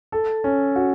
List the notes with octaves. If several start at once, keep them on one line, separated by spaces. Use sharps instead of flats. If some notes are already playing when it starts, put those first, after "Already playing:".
A4
C#4
F#4